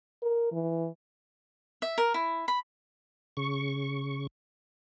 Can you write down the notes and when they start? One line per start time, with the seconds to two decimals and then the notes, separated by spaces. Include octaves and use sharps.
0.22 A#4
0.52 E3
1.82 E5
1.98 A#4
2.14 E4
2.48 B5
3.37 C#3 C#6